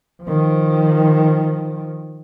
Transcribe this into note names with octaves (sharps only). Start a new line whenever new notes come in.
D#3 F3